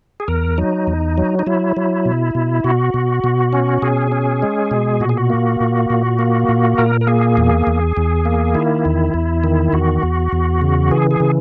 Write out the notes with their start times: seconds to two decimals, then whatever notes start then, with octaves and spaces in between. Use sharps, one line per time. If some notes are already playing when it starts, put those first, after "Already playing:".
0.20 G#4
0.28 E2 A#4
0.58 F#3 D#4
0.87 E2
1.18 F#3
1.39 D#4
1.47 F#3 E4
1.77 F#3
2.05 B2
2.35 B2
2.64 B2 F#4
2.94 B2
3.24 B2
3.53 C#4
3.82 B2 G#4
4.12 C#4
4.42 G#3
4.71 B2
5.00 A#2 F#4
5.09 G#4
5.17 F#4
5.30 A#3
5.61 A#2
5.90 A#2
6.19 A#3
6.49 A#2
6.78 A#2 A#4
7.01 A#4
7.07 A#3 G#4
7.37 E2
7.67 E2
7.97 E2
8.25 A#3
8.54 D#3 E4
8.85 E2
9.14 E2
9.44 D#3
9.73 E2 F#4
10.03 E2
10.32 E2
10.62 C#3
10.91 E3 G#4
11.11 G#4
11.20 C#3